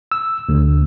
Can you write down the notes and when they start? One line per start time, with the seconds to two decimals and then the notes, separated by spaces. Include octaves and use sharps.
0.12 E6
0.49 D2